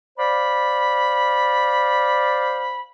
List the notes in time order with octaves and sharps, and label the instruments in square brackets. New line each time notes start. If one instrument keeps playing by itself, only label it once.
[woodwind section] C5 D5 F5 B5